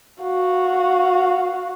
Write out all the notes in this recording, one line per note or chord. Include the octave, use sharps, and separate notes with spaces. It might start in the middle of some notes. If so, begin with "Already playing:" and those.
F#4 F5